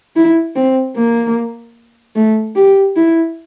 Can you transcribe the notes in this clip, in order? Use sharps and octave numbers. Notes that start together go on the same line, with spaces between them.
E4
C4
A#3
A3
G4
E4